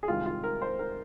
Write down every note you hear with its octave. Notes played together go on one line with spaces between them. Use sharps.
G#4
C2 C3 D#3 G#3 F4
F4
A#4
C5
A#4